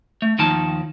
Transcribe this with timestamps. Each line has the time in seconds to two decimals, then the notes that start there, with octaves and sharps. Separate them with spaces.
0.22 A3
0.38 D#2 D#3 F3 A5